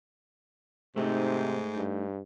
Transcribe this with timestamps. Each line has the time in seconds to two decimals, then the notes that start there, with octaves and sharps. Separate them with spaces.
0.96 G#2 C3 A3 D#4
1.77 G2